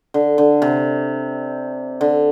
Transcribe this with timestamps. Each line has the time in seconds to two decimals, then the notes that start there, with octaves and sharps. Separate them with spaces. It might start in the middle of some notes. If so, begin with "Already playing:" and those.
0.14 D3
0.38 D3
0.62 C3
2.01 D3